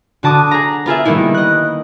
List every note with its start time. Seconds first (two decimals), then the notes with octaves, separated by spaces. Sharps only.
0.23 D3 F#4 A5 D6 D#6
0.51 G#4 A#5
0.86 B3 F4 G#4 E5
1.05 D#3 G3 A#3 B3 D#4 E4
1.34 D#5 F#6